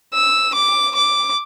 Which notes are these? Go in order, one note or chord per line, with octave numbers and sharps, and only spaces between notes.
E6
D6
D6